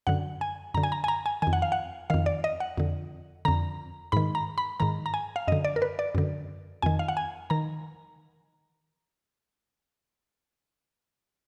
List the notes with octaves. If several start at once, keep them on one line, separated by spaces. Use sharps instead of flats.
F#2 D3 F#5
G#5
F#2 D3 A#5
G#5
A#5
G#5
A#5
G#5
F2 D#3 G#5
F#5
F5
F#5
F2 D#3 F5
D5
D#5
F#5
F2 D3
F2 D3 A#5
G#2 D#3 B5
A#5
B5
G#2 D#3 A#5
A#5
G#5
F5
F#2 D3 D#5
D5
A#4
B4
D5
F#2 D3
F2 D#3 G#5
F5
F#5
G#5
D#3 A#5